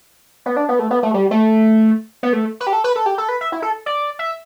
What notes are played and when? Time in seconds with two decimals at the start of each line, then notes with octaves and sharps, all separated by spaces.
0.46 B3
0.56 D4
0.69 B3
0.79 A3
0.91 B3
1.03 A3
1.14 G3
1.31 A3
2.23 B3
2.33 A3
2.60 B4
2.67 G4
2.73 A4
2.84 B4
2.96 A4
3.06 G4
3.18 A4
3.29 B4
3.41 E5
3.52 E4
3.62 A4
3.86 D5
4.19 E5